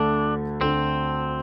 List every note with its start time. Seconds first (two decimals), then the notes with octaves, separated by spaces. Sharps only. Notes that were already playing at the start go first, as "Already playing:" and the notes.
Already playing: D2 D3 A3 D4
0.60 D2 D3 A3 C4